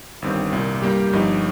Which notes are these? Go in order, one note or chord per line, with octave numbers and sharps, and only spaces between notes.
G1 G2 D#3 C4
C2 A#2 A#3
G2 G3 A#3 G4
G1 G2 F3 D#4